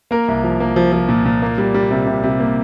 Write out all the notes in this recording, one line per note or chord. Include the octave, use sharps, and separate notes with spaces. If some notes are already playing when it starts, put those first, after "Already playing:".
A#3 A#4
C2
F3
A#3
F3
F3
A#2
A#2
A#3
G3
G3
C3
C3
C3
A#3